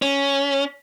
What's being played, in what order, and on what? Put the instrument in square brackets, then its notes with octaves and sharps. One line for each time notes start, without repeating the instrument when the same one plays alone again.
[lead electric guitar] C#4